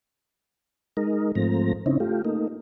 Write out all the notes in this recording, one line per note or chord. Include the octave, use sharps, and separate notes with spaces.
G#3 D#4 A#4
G#2 F3 A3 C4 A#5
C#3 C4 C#4 D#4 E4
A3 F4 G4
A3 A#3 D#4